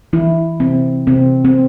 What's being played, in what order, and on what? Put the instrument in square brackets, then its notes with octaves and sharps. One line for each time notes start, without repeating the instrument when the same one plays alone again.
[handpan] E3 E4
C3 C4
C3 C4
C4